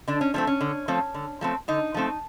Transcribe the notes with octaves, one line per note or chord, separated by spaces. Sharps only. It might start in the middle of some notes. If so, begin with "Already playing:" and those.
D3 D4
C#4
F3 A3 C4 C#4
C#4
D3
F3 A3 C4
D3
F3 A3 C4
D3 D#4
F3 A3 C4